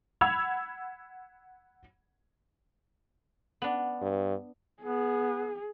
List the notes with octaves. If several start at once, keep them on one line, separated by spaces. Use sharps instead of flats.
F#5 B5 E6 G#6 F7
B3 D4
G2
B3 G#4